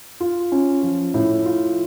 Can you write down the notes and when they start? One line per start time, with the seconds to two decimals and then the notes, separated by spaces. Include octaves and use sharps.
0.20 F4
0.52 C#4
0.83 F3
1.14 A2
1.45 F4